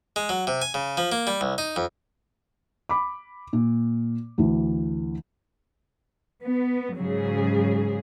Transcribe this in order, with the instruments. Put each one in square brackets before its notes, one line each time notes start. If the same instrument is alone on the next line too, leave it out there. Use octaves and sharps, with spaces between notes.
[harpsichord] G#3
F#3
C3
G#5
C#3
F3
A#3
G3
C2
D#4
F2
[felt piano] B5 D6
A#2
D2 E3
[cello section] B3
G#2 C#3 F#3 G#4